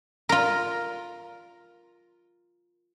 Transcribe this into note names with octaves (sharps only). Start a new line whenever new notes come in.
F4 A#4